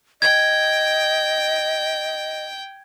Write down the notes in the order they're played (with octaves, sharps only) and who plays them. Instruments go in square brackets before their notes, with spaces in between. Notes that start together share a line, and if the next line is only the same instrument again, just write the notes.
[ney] D#5 [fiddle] G5 [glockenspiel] G#6